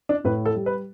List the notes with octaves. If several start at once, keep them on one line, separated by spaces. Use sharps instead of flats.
D4
A2 B4
A4
G3
B4